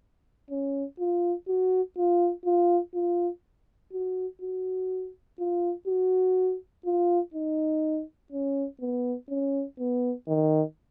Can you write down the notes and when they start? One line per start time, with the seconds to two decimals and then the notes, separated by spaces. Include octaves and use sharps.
0.50 C#4
0.99 F4
1.48 F#4
1.97 F4
2.45 F4
2.94 F4
3.93 F#4
4.42 F#4
5.39 F4
5.87 F#4
6.86 F4
7.34 D#4
8.32 C#4
8.81 B3
9.30 C#4
9.79 B3
10.28 D#3